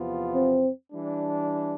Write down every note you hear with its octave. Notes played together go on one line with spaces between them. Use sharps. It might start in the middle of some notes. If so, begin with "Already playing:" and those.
Already playing: E2 C3 F3 B3 F4
C4
E3 G3 D4